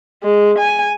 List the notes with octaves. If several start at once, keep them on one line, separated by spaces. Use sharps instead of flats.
G#3
G#5